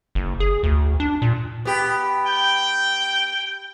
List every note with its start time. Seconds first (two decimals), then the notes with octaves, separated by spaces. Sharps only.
0.15 F#1
0.40 G#4
0.63 D2
1.00 D4
1.22 A#2
1.65 B3 G4
2.25 G5